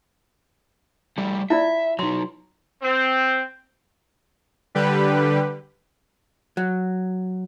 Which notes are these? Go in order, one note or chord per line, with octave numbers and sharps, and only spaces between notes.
G3 A3 E4
E4 F4 D5 E5
F#3 D#4 C6
C4
D3 G3 G4 B4
F#3